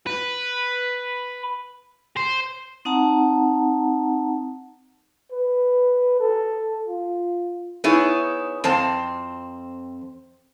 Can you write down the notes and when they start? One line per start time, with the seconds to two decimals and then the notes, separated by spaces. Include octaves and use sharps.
0.07 B4
2.16 C5
2.85 C4 D#4 F#5 A5 A#5
5.32 B4
6.20 A4
6.88 F4
7.84 B3 D#4 E4 G#4 C#5
8.64 F2 C4 C5 A5